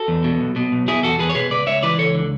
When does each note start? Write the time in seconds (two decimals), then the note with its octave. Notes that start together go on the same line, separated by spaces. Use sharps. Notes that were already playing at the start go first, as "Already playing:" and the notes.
Already playing: F#4 A4
0.08 E2
0.24 B2
0.41 B1
0.56 B2
0.72 B1
0.88 B2 E4 G#4
1.03 E2 F#4 A4
1.19 E2 G#4 B4
1.29 C#5
1.35 B2 G#4 B4
1.51 C#2 B4 D5
1.67 C#2 C#5 E5
1.83 E3 B4 D5
1.99 C#2 A4 C#5
2.15 D3